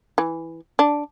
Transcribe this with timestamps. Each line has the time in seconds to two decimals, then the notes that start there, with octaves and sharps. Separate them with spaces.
0.18 E3
0.79 D4